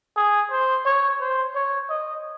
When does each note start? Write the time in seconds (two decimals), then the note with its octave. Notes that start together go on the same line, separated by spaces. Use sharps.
0.16 G#4
0.51 C5
0.85 C#5
1.20 C5
1.55 C#5
1.90 D#5